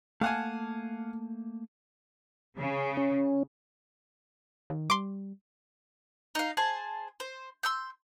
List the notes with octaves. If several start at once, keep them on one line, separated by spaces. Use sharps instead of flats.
A3 A#3 F5 F#5 G#5 A5
C#3
C#4
D#3
G3 C6 D6
D#4 F5
G#4 C5 G#5 A5
C5
C6 E6 G6